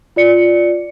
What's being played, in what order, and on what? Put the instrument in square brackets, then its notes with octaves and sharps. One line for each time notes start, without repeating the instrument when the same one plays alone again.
[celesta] F4 D5 C#7